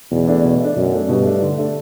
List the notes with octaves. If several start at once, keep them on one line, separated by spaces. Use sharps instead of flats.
E2 B2
A3 D4
B2
A3 D4
F#2 B2
A3 D4
G2 B2
A3 D4
D3
A3 D4